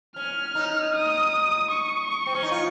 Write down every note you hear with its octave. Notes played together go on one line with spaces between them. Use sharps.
C#4 F6
D#4
D#6
C#6
C4
C#4
D#4
F4